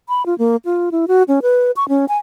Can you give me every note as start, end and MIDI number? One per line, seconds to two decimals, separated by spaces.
0.09 0.25 83
0.26 0.37 65
0.39 0.56 58
0.65 0.89 65
0.92 1.05 64
1.08 1.23 66
1.28 1.40 61
1.42 1.71 71
1.76 1.87 85
1.89 2.05 61
2.08 2.18 80